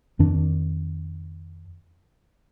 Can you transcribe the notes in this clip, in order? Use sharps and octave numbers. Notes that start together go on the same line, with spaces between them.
F2 D#3 D4